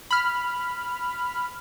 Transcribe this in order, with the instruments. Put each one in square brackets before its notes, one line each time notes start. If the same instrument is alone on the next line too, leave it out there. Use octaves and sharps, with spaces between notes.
[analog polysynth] B5 F6